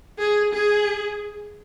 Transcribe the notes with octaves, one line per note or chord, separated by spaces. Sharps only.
G#4
G#4